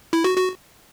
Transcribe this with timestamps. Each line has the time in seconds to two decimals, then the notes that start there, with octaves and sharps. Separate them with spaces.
0.13 E4
0.24 F#4
0.37 F#4